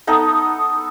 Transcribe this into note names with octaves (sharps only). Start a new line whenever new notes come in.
B3 D#4 A4